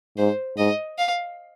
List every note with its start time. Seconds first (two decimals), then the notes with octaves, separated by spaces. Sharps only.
0.17 G#2 C5
0.57 G#2 D#5
0.98 F5